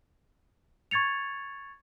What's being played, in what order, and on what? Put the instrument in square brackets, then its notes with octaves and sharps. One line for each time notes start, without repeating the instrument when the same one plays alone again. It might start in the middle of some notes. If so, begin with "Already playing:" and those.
[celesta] C#6 G#6 A6 C#7 F7